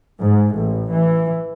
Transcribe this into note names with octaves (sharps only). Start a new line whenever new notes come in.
G#2
A1
E3